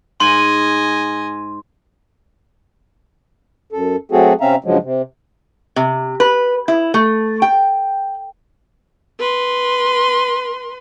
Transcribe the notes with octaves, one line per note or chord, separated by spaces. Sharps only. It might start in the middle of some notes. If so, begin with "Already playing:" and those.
G#2 D#5 G#5 C6
F#2 A4
F#3 A3 C4 F#4 G#4 A4
C3 C4 C#4 E5 F5 A#5
G2 C#3 F3 F#3 G#3
C3
C3
B4
E4
A3
G5
B4 C6